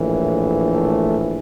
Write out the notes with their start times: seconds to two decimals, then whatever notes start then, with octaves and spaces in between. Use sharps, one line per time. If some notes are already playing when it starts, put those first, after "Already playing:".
Already playing: A#1 A2 E3
0.72 A3